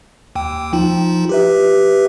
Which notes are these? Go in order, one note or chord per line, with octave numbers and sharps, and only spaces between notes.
D#2 G5
F3 D#4 F4
G4 B4 E5